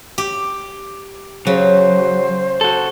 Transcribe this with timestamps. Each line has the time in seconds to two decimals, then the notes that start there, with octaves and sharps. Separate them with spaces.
0.18 G4
1.47 C#3 F#3 C5
2.61 F#4 A4